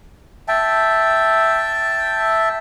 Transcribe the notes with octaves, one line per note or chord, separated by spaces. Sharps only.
E5 G5 A5